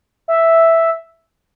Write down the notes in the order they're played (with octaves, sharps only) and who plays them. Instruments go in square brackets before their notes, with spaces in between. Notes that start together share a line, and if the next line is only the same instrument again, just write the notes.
[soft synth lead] E5